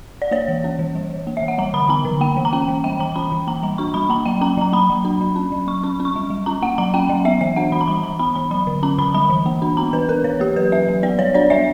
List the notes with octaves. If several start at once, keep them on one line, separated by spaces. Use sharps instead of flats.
D5
A#3 C#5
E3
C#4
E3
G3
E3
A#3
E5
E3
F#5
G3 A#5
D3 B5
B3 A#5
D3
A#3 G5
E3
A#5
C#4 G5
E3
G3 G5
E3 A#5
C#4 B5
E3
A#3 A#5
G3 A#5
D4 C#6
G3 B5
A#3 A#5
F#3 G5
C#4 A#5
F#3 A#5
A#3 B5
F#3
D4
F#3
C#4
F#3
F#3 C#6
C#4 C#6
C#4
C#6
G3
G3
C#4 A#5
A#3 F#5
F#3 A#5
C#4 G5
F#3
B3 E5
E3 E5
D4 F#5
E3 B5
A#5
G3 B5
E3 A#5
B3 B5
E3 B5
F#3 B5
D3
C#4 A#5
D3 B5
G3 B5
E3
A#3
D4
B3 A#5
E3 B4
D4 A#4
E3 C#5
A#3 G4
F#3 B4
C#4 E5
F#3
B3 D5
G3 C#5
D4 D5
G3 E5